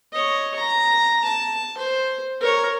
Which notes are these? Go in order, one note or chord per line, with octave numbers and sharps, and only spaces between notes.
C#5 D#5
A#5
A5
C5
A#4 C#5